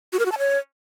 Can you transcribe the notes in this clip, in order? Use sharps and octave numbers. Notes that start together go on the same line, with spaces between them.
F#4
A#4
F#4
A5
C#5